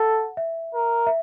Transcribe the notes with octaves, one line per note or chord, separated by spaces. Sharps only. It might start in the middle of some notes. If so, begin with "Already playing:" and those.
Already playing: A4 F#5
E5
A#4
E5